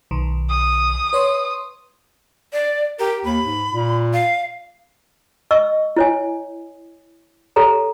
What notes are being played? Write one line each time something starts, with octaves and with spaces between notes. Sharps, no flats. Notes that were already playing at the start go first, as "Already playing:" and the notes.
B1 D#3
D#6
B4 C#5 C6
D5
G4 A#4
D#2 B5
G#2
A#2
F5
D#5 C#6 E6
E4 C#5 G#5
G4 A4 C#5 A#5